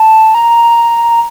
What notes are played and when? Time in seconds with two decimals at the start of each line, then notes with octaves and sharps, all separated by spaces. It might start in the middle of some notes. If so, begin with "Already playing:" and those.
Already playing: A5
0.35 A#5